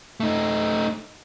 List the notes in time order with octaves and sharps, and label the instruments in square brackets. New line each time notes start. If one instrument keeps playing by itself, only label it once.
[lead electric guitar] A3 D#4